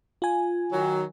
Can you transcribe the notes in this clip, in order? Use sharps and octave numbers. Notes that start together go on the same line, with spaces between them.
F4 G#5
D#3 F#3